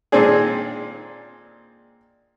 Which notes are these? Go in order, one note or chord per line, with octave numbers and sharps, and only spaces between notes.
A#2 D#3 G#3 C4 D4 G#4